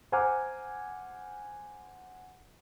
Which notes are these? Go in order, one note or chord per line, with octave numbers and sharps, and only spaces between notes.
C5 F#5 G#5 A#5 D6 F6